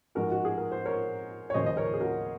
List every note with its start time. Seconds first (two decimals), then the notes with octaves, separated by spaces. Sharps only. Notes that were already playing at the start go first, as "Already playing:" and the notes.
0.15 G#2 F3 G#3 F#4 A#4
0.31 F#4
0.45 G#4
0.58 A#4
0.72 C5
0.86 A#4 C#5
1.50 C#5
1.54 D#2 C#3 F3 G#3 C5 D#5
1.66 D#5
1.77 A#4 C#5
1.94 G#4
2.01 F#4 A#4